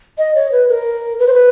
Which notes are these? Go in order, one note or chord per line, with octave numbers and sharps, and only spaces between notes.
D#5
C#5
B4
A#4
B4
C5
B4